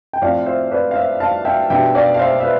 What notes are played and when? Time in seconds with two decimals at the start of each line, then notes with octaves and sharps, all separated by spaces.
0.13 G5
0.22 A2 F3 C4 D5 F5
0.46 C5 E5
0.71 B4 D5
0.91 F5
0.96 C5 E5
1.20 F5 A5
1.45 E5 G5
1.70 B2 G3 B3 D4 E5 G5
1.95 D5 F5
2.14 F5
2.19 C5 E5
2.40 E5
2.44 B4